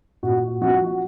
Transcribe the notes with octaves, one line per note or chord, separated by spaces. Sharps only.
A#2 F#4
F3 F#4